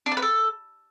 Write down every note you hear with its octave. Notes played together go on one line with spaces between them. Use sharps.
D4
D5
B4
A4